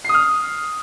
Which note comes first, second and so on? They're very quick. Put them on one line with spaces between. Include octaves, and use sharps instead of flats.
C7 D#6 F6